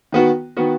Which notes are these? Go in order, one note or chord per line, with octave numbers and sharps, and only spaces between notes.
D#3 B3 F#4
D#3 B3 F#4